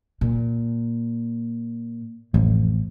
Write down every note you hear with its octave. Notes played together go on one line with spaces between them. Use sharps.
A#2
A1 F2